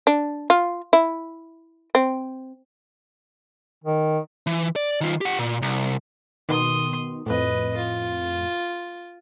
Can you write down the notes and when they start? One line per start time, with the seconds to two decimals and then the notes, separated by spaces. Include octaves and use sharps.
0.07 D4
0.50 F4
0.93 E4
1.95 C4
3.84 D#3
4.47 E3
4.76 D5
5.01 D#3 F4
5.21 G4 F#5
5.39 A#2
5.62 C2
6.49 B2 D#3 C6 D#6
7.26 F2 A2 B4 D#5
7.77 F4